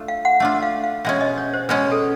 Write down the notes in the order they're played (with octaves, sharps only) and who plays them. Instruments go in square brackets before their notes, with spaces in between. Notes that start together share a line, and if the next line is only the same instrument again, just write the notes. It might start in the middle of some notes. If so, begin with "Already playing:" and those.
Already playing: [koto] A3 D4 F4
[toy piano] F5
F#5
[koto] A3 D4 F4
[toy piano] F5
F5
[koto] B2 G#3 C#4 [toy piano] E5
[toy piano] D#5
C#5
C5
[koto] B2 G#3 C#4 [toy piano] B4
[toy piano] A4